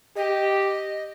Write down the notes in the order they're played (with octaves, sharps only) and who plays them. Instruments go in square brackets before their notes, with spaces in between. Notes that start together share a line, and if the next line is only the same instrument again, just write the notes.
[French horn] G4 [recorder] D#5